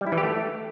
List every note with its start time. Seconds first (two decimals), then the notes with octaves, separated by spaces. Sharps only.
0.01 G3
0.07 E4
0.12 E3
0.18 G4
0.23 A3